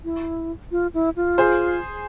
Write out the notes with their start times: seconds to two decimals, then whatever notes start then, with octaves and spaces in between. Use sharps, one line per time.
0.05 E4
0.72 F4
0.94 E4
1.16 F4
1.38 G#4 C5